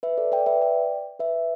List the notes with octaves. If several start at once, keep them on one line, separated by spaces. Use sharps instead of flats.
B4 E5
A4 D5
D5 G5
B4 E5
D5 G5
B4 E5